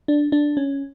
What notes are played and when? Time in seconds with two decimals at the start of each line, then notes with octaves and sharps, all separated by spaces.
0.08 D4
0.32 D4
0.57 C#4